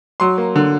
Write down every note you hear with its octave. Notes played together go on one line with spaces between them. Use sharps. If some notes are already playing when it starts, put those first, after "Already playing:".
F#3 C6
A#3
D3